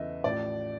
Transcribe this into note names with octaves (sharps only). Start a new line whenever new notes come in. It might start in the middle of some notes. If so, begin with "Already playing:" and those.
Already playing: E2 C#3 E3 D#5 E5
A1 A2 F3 D5